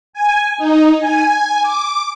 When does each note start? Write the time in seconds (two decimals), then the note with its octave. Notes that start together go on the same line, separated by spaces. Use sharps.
0.13 G#5
0.58 D#4
0.99 G#5
1.63 D6